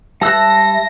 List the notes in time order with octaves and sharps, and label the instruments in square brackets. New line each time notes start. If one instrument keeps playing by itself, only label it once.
[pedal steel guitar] G3 E6 F#6 [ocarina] E5 [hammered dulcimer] A5 [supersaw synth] A#6